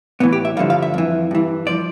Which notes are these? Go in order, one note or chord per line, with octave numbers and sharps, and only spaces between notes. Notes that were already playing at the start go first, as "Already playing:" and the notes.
A2 E3 B3
G4
E5
G2 D3 F3 F5
F5
E5
F2 E3
G2 E3
F3 D5